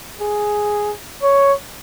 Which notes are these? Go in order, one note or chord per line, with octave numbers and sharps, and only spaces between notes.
G#4
C#5